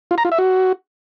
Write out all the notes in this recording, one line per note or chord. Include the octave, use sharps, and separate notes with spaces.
F4
A#5
F4
E5
F#4